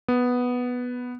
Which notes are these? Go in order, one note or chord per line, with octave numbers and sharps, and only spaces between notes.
B3